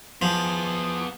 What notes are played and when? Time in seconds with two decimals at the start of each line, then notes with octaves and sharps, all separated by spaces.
0.22 F3 B3 G#4